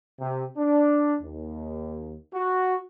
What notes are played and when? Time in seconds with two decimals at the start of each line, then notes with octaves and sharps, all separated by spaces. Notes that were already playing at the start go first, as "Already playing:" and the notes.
0.20 C3
0.57 D4
1.22 D#2
2.34 F#4